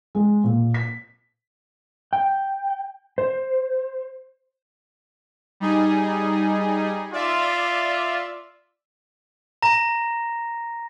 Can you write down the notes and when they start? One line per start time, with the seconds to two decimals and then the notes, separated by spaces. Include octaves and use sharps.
0.15 G#3
0.44 A#2
0.74 B6
2.13 G5
3.18 C5
5.60 G3 D#4 G#4
7.13 F4 D5 E5
9.62 A#5 A#6